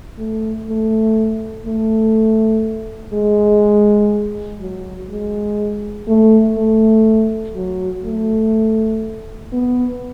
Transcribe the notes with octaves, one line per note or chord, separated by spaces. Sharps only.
A3
A3
A3
G#3
F#3
G#3
A3
A3
F#3
A3
B3